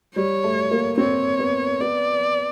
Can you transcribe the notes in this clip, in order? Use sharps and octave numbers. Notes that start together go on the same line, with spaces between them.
G3 C#5
A3
A#3
C4 C#5
B3
B3 D5